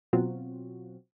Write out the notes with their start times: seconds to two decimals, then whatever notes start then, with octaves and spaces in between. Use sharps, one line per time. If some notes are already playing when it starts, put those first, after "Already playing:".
0.13 B2 F#3 C4 F4 F#4